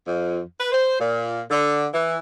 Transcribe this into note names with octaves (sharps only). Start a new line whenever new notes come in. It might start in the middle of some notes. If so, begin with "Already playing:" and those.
F2
B4
C5
A#2
D3
E3